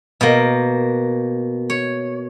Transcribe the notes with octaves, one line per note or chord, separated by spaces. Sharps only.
B2 A#3
C#5